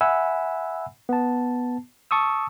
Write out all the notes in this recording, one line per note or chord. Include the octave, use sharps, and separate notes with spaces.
E5 F#5 G#5 B5 E6
B3 A5
A5 C#6 D#6 E6